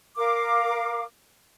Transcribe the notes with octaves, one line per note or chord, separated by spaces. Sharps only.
A#4 F5 D6